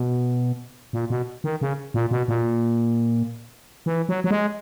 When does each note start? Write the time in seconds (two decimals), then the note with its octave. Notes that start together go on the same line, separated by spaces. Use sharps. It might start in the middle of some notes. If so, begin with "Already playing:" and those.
Already playing: B2
0.93 A#2
1.10 B2
1.44 D#3
1.61 C#3
1.94 A#2
2.11 B2
2.28 A#2
3.86 E3
4.09 F#3
4.24 F#3
4.31 G#3